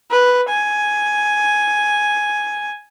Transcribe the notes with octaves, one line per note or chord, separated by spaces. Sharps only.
B4
G#5